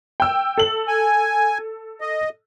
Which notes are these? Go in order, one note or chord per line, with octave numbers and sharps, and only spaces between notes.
G5 E6
A4 F#7
G#5
D#5